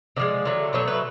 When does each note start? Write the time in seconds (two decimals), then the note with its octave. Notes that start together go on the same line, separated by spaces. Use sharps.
0.16 D3 F3 G#3 D5
0.45 D3 F#3 A3
0.73 B2 F#3 A3 C#5
0.88 B4